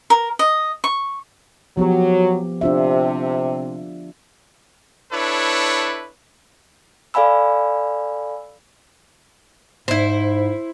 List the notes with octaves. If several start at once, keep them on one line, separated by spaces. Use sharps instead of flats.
A#4
D#5
C#6
F3 F#3 B3 G4
C3 D4 F4 E5
D4 E4 A4 B4 C#5
A4 D5 F5 G#5 B5 E6
G#2 E4 C5